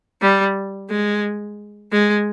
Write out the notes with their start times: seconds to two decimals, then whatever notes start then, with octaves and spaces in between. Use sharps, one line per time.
0.22 G3
0.90 G#3
1.92 G#3